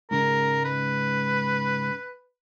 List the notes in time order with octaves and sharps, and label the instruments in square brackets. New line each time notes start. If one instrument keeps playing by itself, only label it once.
[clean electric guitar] G#2 C#3 G#3 [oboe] A#4
[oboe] B4